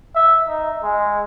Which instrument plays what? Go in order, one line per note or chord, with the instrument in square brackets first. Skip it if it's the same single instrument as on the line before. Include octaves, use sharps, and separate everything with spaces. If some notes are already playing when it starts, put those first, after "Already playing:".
[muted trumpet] E5
D#4
G#3